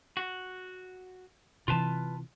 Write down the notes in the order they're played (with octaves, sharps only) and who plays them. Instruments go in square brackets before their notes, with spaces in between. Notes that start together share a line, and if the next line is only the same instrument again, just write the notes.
[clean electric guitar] F#4
[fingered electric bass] C3 E3 [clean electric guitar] F4 B4 A5